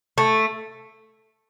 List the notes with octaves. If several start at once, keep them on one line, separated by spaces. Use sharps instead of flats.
A3